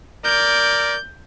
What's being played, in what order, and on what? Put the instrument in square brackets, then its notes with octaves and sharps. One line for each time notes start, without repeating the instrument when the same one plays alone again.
[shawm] A#4 [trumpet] D5 [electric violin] G6